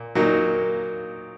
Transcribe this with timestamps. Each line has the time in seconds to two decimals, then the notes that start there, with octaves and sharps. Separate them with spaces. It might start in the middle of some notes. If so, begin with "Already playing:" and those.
Already playing: A#2
0.15 A#2 F#3 A#3 D#4